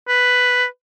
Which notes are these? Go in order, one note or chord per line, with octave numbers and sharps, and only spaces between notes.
B4